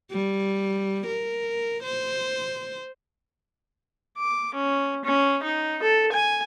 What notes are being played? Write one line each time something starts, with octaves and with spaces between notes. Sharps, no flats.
G3
A#4
C5
D6
C#4
C#4
D#4
A4
G#5